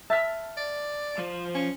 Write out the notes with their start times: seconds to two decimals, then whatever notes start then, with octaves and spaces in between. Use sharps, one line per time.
0.10 E5 A5 F6
0.57 D5
1.18 F3 C5
1.55 C#4